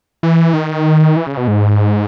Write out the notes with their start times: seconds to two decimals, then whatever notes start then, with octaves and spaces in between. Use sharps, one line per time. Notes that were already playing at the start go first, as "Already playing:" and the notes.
0.23 E3
0.54 D#3
1.16 E3
1.27 C#3
1.37 B2
1.48 G#2